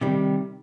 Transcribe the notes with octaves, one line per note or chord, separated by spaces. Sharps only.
C3 D#3 G3